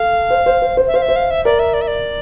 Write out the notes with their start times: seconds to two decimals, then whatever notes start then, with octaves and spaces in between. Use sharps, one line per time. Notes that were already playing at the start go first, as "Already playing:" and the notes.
Already playing: A4 F5
0.30 C5
0.46 C5
0.62 C5
0.77 C5
0.87 E5
0.94 C5 F5
1.02 E5
1.08 C5
1.16 F5
1.30 E5
1.45 A#4 D5
1.59 E5
1.74 D5
1.81 E5
1.87 D5